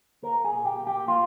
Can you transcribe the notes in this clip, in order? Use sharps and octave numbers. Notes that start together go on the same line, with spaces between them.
A#3 A#4
G#4
A#2
G4
A#3
G4
A#3 F4